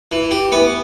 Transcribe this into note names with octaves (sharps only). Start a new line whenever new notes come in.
E3
G4
E3 B3